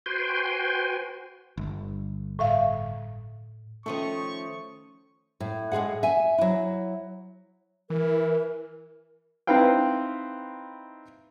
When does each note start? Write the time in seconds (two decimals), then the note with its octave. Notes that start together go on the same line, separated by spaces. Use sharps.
0.06 F#4 B4 C5 G5 G#5 C6
1.57 G1
2.39 A2 E5 F5
3.86 D#3 F3 A3 C#4 C#6 D#6
5.40 A2
5.72 A2 G#3 G#4 F#5
6.03 E5 G#5
6.38 F#3 E4
7.90 E3 A#4
9.47 C4 D#4 E4 B4 F5 G5